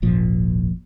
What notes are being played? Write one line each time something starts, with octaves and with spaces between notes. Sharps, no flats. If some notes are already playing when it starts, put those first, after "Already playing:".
D#1 G#1 A#2 F3